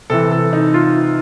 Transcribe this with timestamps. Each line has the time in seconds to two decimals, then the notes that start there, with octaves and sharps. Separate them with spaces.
0.10 C3 E3 A4
0.31 A4
0.53 D#4
0.74 F4